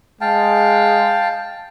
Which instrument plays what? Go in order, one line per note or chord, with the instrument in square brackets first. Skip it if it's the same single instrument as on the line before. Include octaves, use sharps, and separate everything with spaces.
[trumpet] G#3 [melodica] F5 G5 A5